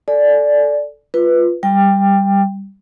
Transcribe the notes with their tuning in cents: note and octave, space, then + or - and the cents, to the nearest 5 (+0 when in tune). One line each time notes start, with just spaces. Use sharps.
A4 +0 D5 +0 G#5 +35
F4 +0 B4 +0
G3 +0 G5 +15